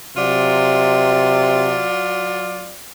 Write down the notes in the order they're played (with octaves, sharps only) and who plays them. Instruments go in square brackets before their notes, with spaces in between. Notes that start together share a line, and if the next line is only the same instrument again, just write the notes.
[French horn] C3 [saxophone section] F#3 F4 D5